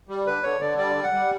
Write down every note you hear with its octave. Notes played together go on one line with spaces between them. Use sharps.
G3
D3 B4
D3 C#5
D3 D5
G3 D5
G3
F#5
G3